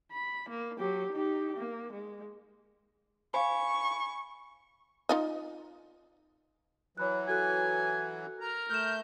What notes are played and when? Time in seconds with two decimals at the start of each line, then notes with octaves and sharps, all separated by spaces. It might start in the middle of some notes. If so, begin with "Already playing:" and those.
0.12 B5
0.50 A#3
0.78 F#3 G4
1.13 D#4 G4
1.57 A#3
1.92 G#3
3.34 C5 F5 G#5 B5 C#6
5.09 D#4 F4 D#5
6.97 E3 F#3 C#5 B5 F#6
7.28 F#4 A4 G#5 F#6
8.41 A#4 A#5
8.70 A3 F6 G6 E7